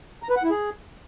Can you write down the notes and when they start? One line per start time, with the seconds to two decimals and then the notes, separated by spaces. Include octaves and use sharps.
0.23 A#5
0.30 B4
0.37 F#5
0.44 E4
0.50 G#4